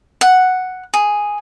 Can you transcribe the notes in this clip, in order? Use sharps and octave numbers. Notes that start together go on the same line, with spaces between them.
F#5
G#4